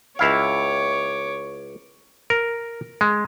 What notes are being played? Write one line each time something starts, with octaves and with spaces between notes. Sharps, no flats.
C#2 E4 C#5 F5 D6
A#4
G#3